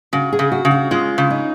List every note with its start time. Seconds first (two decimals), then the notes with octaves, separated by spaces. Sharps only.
0.13 C#3 F#4
0.33 G#4
0.39 C#3
0.52 F#4
0.65 C#3
0.71 F#4
0.91 G#3 F4
1.18 C#3
1.30 D#4